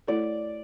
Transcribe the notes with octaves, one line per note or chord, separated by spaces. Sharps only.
A3 E4 A4 D5